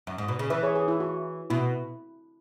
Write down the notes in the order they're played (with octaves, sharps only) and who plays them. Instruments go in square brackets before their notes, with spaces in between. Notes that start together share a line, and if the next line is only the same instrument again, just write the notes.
[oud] F#2
G#2
B2
C#3
[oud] E3 [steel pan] B4 E5
[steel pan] G#4 C#5
G#4
E4
F#4
[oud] B2 [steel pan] E4